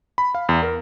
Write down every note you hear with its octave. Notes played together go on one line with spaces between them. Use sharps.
B5
F5
E2
A#4